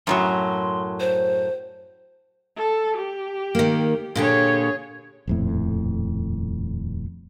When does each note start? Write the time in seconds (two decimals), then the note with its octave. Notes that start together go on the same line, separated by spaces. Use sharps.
0.07 F#2 A2 F#3 C6
1.00 C5
2.57 A4
2.97 G4
3.55 D#3 A#3
4.15 A#2 D3 G4 G#4 C#5
5.27 D#1 F2 A2